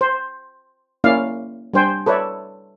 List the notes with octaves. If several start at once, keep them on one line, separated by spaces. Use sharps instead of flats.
C5
A#3 C#4 E4 D5 F5
G3 D4 C5 G5 G#5
A4 B4 C#5 D5 E5